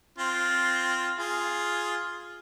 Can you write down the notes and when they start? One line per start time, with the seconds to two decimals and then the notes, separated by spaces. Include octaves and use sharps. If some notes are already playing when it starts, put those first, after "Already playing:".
0.19 C4 F4
1.19 F4 G#4